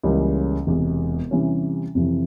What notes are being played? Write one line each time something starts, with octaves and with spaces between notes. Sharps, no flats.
C#2 C#3 E3 G3 A#3
E1 E2 C3
C3 E3 G3 C#4
F2 C3 E3